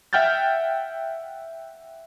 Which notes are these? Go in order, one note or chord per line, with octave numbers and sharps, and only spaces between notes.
E5 F#5 G5 F6 G6 A6